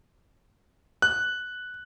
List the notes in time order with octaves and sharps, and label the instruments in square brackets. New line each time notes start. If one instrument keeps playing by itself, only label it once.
[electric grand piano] F#6